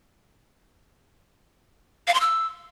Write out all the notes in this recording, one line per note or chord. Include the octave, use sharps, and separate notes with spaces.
F5
C6
E6